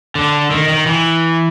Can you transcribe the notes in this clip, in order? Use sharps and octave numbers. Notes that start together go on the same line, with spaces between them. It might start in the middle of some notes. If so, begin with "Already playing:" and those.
D3
D#3
D#3
E3